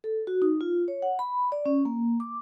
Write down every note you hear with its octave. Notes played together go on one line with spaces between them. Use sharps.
A4
F#4
D#4
F4
C#5
F#5
B5
D5
C#4
A#3
D6